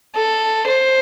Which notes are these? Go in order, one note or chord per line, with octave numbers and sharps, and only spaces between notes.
A4
C5